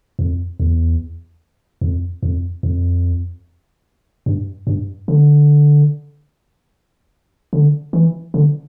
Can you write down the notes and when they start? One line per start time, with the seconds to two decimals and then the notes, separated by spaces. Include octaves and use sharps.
0.19 F2
0.60 E2
1.81 F2
2.23 F2
2.63 F2
4.26 G2
4.67 G2
5.08 D3
7.53 D3
7.93 E3
8.34 D3